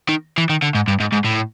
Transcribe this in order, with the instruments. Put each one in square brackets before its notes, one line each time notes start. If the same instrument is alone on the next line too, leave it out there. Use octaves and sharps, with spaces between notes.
[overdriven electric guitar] D#3
E3
D#3
D3
G#2
G2
G#2
G#2
A2